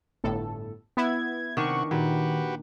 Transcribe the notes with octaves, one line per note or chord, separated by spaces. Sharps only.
G1 A2 A4
B3 E4 G#6
C3 D#3 D4 F#5 C#6
A#2 D#3 F#4 G4 B4